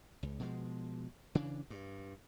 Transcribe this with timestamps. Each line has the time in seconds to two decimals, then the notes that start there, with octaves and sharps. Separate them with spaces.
0.23 C#2
0.40 B2 F3 G#3
1.35 C#3 E3 D4
1.70 G2